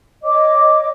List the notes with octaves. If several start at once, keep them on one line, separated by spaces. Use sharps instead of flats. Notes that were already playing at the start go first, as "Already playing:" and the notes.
C#5 D#5 D6